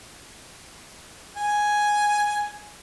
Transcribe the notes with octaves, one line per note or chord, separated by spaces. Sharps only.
G#5